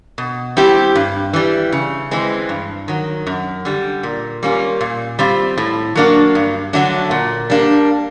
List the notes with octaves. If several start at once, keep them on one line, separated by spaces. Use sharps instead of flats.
B2
G3 C4 E4 G4
G2
E3 G3
C#3
E3 G#3 C4
G2
D#3 F#3
F#2
D3 G3
A#2
G3 A#3 C#4 F4
A#2
G3 C4 F4
A2
F#3 A#3 D4 F#4
G2
D3 F#3 A3 D4
A#2
G3 A#3 D4